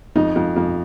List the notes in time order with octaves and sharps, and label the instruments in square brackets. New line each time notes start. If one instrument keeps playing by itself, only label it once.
[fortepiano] F2 D#4
F2
F2